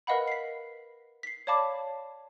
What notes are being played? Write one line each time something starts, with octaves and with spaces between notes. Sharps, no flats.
A#4 B4 D#5 F5 F#5 B5
B6 C7
B6 C7
C#5 D5 F5 A5 B5 D6